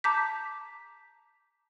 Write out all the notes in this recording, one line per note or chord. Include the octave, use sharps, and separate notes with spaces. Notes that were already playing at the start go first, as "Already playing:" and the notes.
A5 A#5 D6 G6 B6